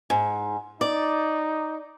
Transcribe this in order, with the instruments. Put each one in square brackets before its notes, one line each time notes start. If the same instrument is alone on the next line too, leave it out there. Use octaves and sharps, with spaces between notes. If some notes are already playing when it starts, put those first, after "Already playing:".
[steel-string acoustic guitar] G#2
[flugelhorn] D#4 [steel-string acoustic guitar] D5